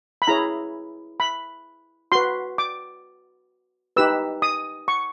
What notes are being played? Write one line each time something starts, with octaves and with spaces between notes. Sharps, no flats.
B5
E4 G#4 C#5 A#5
B5
F#4 B4 C6
D6
D#4 G4 B4 E6
D#6
C#6